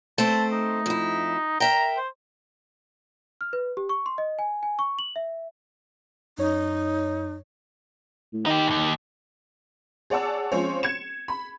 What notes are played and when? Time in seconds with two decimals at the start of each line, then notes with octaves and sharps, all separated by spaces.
0.18 A3 C4 C5 A5
0.53 D#4
0.86 F2 E4
1.60 A#4 E5 G5 A#5
1.97 C5
3.41 F6
3.53 B4
3.77 G4
3.89 C#6
4.06 C6
4.18 D#5
4.39 G#5
4.63 G#5
4.79 C#6
4.99 F#7
5.16 E5
6.38 F#2 D#4 C#5
8.33 A2
8.46 D#3 D#4 G4
8.67 D#2 G#2
10.10 G#4 C#5 D5 F#5 A5 E6
10.52 F3 G#3 C4 C#4 C5 C#5
10.83 G#6 C#7 E7
11.28 B5